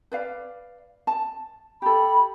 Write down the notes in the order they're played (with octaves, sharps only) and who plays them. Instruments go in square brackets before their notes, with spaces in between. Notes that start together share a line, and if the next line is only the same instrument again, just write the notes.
[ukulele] B4 D5 F5
A5
[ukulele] G4 A4 [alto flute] B5